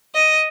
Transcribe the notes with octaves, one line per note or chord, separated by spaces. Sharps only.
D#5